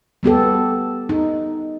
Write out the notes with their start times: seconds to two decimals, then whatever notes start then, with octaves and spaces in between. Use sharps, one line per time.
0.23 G3 B3 G4 A4
1.09 D#4